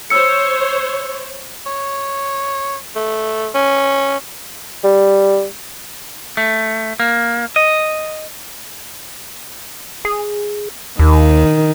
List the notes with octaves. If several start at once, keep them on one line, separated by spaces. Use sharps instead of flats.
C5 C#5 E6 C#7
C#5
A3
C#4
G3
A3
A#3
D#5
G#4
D#2 D#3